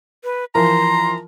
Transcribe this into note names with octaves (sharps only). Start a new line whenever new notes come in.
B4
E3 F3 A#4 A#5 C6